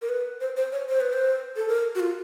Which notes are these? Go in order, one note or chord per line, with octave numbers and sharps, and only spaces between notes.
A#4
B4
C5
C5
C#5
C5
B4
C5
A4
A#4
F#4
F4